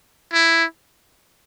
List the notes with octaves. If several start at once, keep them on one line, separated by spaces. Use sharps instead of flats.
E4